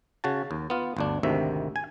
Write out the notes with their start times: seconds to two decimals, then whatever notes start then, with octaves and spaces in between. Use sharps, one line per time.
0.24 C#3 F#4 A5
0.51 D#2
0.70 B3 F4
0.97 G1 D2 D4
1.23 G#1 D2 C3 D#3 E5
1.76 G#5